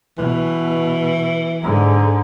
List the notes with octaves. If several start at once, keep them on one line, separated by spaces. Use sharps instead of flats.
B2 E3
G#2 D3